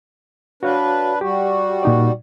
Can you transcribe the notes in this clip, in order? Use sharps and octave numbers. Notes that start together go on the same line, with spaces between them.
D4 F#4 B4 C#5 F5
G3 F#4 G4
A#2 D#4 D5